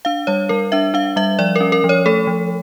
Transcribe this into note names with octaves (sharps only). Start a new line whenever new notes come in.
D4 F5
G3 C#5
G3 A#4
D4 E5
D4 F5
G3 E5
F3 D5
C#4 A#4
A#4
F3
C#5
A3 A4
F3